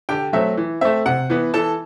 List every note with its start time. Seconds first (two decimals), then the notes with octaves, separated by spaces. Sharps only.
0.09 D3 G4 G5
0.33 F#3 A3 C4 E5
0.57 E3
0.81 A3 C4 E5
1.06 C3 F#5
1.30 E3 B3
1.54 E3 A4 A5